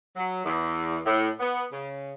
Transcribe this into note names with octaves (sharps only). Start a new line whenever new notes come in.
F#3
E2
A2
B3
C#3